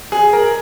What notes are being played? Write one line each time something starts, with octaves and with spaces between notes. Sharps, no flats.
G#4
A#4